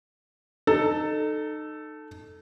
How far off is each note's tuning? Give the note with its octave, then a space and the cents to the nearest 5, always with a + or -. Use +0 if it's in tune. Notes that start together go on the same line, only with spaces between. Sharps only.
D#4 -25 A4 +0